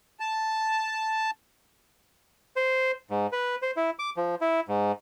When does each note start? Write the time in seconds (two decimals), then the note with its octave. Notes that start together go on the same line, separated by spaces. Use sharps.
0.20 A5
2.56 C5
3.10 G#2
3.32 B4
3.62 C5
3.76 E4
3.99 D6
4.17 F3
4.41 E4
4.68 G#2